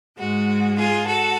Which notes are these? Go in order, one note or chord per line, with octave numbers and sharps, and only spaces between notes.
G#2 G#3 F#4
F4 G#4
F#4 A4